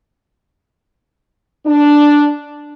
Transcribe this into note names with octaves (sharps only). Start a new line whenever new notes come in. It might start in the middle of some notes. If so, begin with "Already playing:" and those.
D4